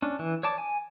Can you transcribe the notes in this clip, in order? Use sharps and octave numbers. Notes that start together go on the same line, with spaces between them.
C#4 D4
E3
C#5 D5 A5 D6
G#5